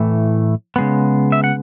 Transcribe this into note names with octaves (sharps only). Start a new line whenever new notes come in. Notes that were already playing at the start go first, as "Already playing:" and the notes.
Already playing: A2 E3 A3
C#3 G#3 B3
E5
F#5